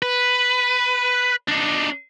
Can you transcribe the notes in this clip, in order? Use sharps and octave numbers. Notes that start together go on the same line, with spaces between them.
B4
D4 D#4